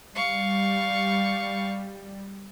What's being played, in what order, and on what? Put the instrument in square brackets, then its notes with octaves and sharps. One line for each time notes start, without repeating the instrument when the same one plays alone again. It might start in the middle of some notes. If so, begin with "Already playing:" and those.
[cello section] G3 [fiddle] F5 C#6